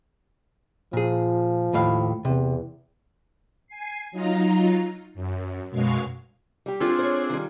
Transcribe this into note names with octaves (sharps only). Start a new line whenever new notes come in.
A#2 F3 G#4
D#2 A2 F5
E2 C3
G#5 C7
F#3 D#4 F4 A#5
F#2
F#2 B2 G#3 F5 C#6
G3 G4
C4 D4 F4 G#4 A4
C5 C#5
D#3 G3